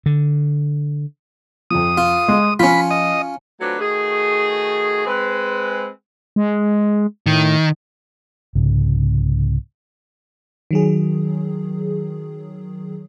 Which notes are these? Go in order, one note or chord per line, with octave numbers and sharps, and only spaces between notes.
D3
F2 F3 D#6
F4
G#3
F3 C#4 F4 B5
D#5
F#3 A3 C4 D4 F4 B4
D#3 A3 F#4 G#4
G#3 C4 B4
G#3
A2 D#3
C2 G#2 C#3
D#3 F#3 G#4